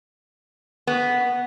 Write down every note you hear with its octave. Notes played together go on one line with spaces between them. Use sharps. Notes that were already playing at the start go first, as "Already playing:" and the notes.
B3